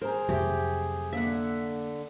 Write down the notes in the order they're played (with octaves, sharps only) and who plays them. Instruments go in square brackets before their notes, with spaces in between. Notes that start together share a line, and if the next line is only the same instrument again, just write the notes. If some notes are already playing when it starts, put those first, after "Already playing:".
[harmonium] G#4 [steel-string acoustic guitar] A#4 A#5 [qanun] C5
[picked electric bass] F2 C3 F#3 [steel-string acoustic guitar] A3 [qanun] G4
[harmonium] D3 [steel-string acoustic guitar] A#3 [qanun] E5 F#5